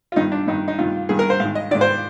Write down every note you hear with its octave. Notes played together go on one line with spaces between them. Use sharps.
F4
G2 D#3 D#4
D4
G2 D#3 D#4
D#4
G2 D#3 F4
G2 D#3 G#4
A#4
C5
G#2 F5
D#3
D#5
G#2 D#3 D5
C5